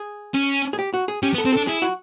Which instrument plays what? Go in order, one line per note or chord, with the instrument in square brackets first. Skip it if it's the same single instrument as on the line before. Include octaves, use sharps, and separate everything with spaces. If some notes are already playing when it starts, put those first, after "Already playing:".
Already playing: [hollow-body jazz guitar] G#4
[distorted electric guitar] C#4
[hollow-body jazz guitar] G#4
G4
F#4
G#4
[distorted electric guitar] C#4 [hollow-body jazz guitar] G4
[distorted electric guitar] B3
[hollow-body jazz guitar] A4
[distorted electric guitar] C4
[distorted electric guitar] D4 [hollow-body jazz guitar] A4
[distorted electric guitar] E4 [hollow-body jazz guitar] G#4
[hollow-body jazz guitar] F#4